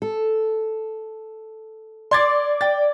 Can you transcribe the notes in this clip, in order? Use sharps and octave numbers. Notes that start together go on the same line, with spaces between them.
A4
D5 C6 G#6 A6
G5 A6